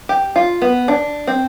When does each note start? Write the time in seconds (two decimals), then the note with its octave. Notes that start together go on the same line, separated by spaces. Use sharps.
0.09 G4
0.36 F4
0.62 B3
0.88 D4
1.27 C4